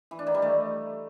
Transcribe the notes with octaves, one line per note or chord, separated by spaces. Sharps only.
E3
D4
D#3
G3
A3